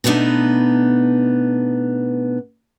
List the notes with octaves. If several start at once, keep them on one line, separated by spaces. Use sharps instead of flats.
B2 A3 B3 D4 D#4